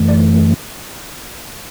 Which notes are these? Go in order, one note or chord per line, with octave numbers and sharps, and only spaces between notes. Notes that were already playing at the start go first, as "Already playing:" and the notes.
Already playing: F#2 E3 A3
D5